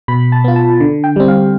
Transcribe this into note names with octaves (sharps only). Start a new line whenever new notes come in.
B2 B5
A5
B3 F4
A5
D3
G5
G3 C4
F5